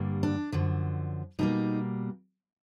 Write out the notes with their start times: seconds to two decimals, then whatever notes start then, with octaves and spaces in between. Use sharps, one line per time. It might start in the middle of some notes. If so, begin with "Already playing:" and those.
Already playing: G2 D3 G3 A#3
0.23 D4
0.52 F#2 D3 F3
1.39 B2 G3 A#3 D#4